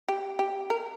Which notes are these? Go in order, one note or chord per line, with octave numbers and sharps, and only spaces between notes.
G4
G4
A#4